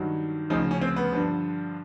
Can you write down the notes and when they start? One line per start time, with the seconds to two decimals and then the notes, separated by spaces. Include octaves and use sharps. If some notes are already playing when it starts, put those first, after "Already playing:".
Already playing: G2 D#3 F#3
0.50 D2 C#3 F3 D#4
0.71 C#4
0.81 C4
0.96 B3
1.13 G2 D3 F3